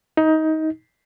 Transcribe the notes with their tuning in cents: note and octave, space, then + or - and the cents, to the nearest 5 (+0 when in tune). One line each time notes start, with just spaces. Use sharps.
D#4 +20